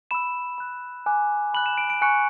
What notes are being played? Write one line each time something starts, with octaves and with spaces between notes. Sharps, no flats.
B5 E6 E7
B5 F#6
G#5 D6 F#6
B5 F#6 F#7
E7
D7
D7
G#5 C#6 F#6 C#7